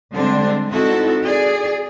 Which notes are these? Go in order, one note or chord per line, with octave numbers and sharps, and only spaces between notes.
D3 G3 G#3 C4 D4
C4 D#4 E4 F#4 A4
G#4 D5